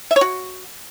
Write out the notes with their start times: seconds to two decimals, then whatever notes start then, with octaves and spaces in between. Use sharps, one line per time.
0.11 E5
0.16 C#5
0.21 F#4